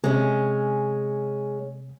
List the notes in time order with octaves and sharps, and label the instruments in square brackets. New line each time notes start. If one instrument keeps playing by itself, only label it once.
[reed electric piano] C3 [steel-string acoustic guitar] G#3 C#4